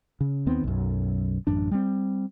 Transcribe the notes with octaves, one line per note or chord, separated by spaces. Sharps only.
C#3
D#2 D#3 B3 C4
B1 F#2
A1 F#2 D4
G3 C4